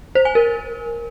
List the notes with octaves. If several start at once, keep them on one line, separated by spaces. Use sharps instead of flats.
C5
G#5
A#4